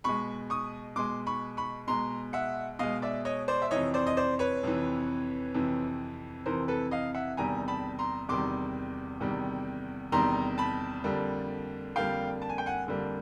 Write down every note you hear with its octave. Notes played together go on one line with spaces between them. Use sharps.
B2 G#3 B5 C#6
C#6 D#6
B2 G#3 C6 D6
B5 C#6
B5 C#6
B2 G#3 A#5 C6
E5 F#5
B2 G#3 D#5 F5
D5 E5
C#5 D#5
C5 D5
E5
F2 C3 E3 C#5 D#5
C5 D5
D#5
C5 D5
B4 C#5
F2 C3 E3
F2 C3 E3
F2 C3 E3 A#4 C5
A4 B4
D#5 F5
E5 F#5
E2 C3 D#3 G3 G#5 A#5
A5 B5
A#5 C6
E2 C3 D#3 G3 C6 D6
E2 C3 D#3 G3
E2 C3 D#3 G3 A#5 C6
A5 B5
F2 D3 G3 A#3
F2 D3 G3 A#3 F5 G5
A5
G#5
G5
F#5 G#5
F2 D3 G3 A#3